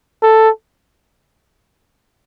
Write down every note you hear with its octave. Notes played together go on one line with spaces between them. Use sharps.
A4